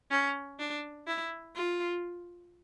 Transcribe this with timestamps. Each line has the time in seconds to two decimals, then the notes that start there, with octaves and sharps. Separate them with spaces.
0.11 C#4
0.59 D4
1.07 E4
1.56 F4